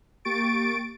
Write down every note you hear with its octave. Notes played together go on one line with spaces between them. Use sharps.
A#3 G4 C#6 A6 D7